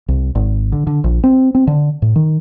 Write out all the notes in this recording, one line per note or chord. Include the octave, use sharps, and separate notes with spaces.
C2
G#1
D3
D3
A#1
C4
C4
D3
A2
D#3